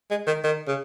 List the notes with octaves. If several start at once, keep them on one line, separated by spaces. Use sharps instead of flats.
G#3
D#3
D#3
C#3